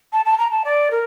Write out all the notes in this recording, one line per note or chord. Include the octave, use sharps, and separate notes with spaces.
A5
A5
A#5
A5
D5
A#4